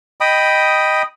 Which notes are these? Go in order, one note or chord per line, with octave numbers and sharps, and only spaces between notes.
D#5 G5 B5 D#6